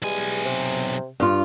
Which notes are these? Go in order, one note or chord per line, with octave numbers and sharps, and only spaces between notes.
B1 E3 G3 G#3 G#5
C3
G2 F4